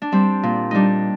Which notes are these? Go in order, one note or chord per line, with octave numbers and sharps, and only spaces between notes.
D4
G3 C4
A#2
G3 D4 D#4